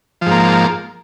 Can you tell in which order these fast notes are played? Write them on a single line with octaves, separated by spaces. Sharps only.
F3 G#2 A#3